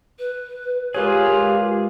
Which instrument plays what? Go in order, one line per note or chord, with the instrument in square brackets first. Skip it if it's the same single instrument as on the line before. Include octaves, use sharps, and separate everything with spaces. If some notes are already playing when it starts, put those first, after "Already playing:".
[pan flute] B4
[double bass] G#3 [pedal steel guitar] F4 G#4 [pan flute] G4 [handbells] A#4 B4 C#5